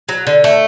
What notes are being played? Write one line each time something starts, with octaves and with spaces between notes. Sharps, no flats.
F#3
D3
A3